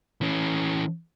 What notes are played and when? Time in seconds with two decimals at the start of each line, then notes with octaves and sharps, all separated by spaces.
0.21 E3 C#4